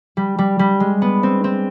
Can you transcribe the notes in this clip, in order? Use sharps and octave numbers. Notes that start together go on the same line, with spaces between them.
G3
G3
G3
G#3
B3
C4
C4